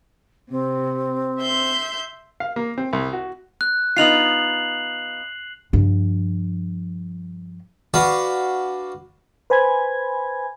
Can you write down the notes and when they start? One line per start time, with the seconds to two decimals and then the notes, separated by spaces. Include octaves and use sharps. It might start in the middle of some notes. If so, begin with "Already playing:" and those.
0.51 C3 C4
1.41 E5 C6 G6
2.40 F5
2.56 A#3
2.78 C4
2.93 C2
3.13 F#4
3.61 F#6
3.97 B3 D#4 F4 C7 F7 F#7
5.73 G2 F3
7.94 D4 F#4 B4 F5
9.50 B4 C5 G#5 B5 G#6